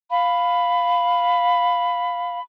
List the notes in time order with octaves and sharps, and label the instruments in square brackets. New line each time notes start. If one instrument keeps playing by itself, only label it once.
[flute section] F5 B5